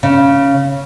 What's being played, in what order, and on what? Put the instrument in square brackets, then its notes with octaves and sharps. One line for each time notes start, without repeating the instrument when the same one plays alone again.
[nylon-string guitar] C#3